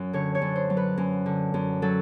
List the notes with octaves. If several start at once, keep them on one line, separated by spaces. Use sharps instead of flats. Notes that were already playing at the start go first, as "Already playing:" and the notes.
Already playing: F#2 F#3
D3 C#5
C#5
F#2
C5
F#3
B4
F#2
D3
F#2
F#3 A4